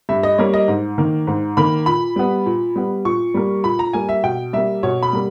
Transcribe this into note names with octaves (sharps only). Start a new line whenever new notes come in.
G2 E5
D#5
G3 A#3 C#5
D#5
G#2
D#3 A#3
G#2
D#3 A#3 B5
A#2 B5
G3 B3
A#2
G3 B3
A#2 C#6
G3 A#3
A#2 B5
A#5
G3 A#3 G#5
E5
B2 G5
G3 A#3 E5
B2 C#5
B5
G3 A#3